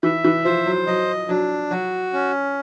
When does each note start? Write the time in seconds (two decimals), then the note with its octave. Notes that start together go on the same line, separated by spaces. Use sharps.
0.03 E3 E5
0.24 E3
0.45 F3 C5
0.66 F#3
0.87 F#3 D#5
1.29 F#3 D4
1.71 F#3 F#4
2.13 C#4